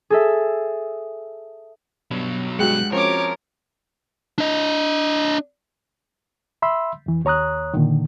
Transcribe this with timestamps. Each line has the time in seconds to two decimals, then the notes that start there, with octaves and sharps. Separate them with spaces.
0.10 G#4 A4 E5
2.11 G2 B2 F#3
2.59 G2 G#3 F#4 G5 F#6 C#7
2.92 F3 C4 C#4 A#4 C#5 D6
4.38 D4 D#5
6.62 E5 B5 C6 E6
7.06 F2 E3
7.25 D#2 C#5 A#5 D#6 F#6
7.74 A#2 D3 D#3